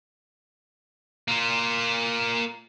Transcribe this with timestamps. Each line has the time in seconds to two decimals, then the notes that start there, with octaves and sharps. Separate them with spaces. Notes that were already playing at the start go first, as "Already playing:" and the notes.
1.28 A#3 F4